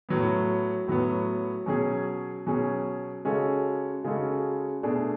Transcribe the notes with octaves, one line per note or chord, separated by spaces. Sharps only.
A2 F#3 B3
A2 F#3 B3
B2 F#3 C#4 G#4
B2 F#3 C#4 G#4
C#3 G#3 C#4 F#4 A4
C#3 G#3 C#4 F#4 A4
B2 A3 D4 G#4